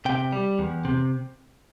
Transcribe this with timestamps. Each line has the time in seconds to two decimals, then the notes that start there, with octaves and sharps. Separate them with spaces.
0.05 C3 G5
0.32 G3
0.59 E2
0.85 C3